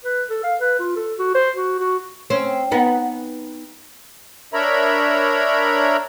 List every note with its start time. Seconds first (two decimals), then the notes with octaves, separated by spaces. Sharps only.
0.04 B4
0.30 A4
0.43 F5
0.60 B4
0.80 F4
0.96 A4
1.19 F#4
1.35 C5
1.56 F#4
1.79 F#4
2.30 C4 C#4
2.71 B3 D#4
4.54 D4 A#4 C#5 E5 A#5 B5